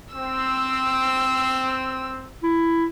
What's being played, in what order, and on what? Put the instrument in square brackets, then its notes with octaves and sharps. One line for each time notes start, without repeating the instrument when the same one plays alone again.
[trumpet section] C4 [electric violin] E6
[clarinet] E4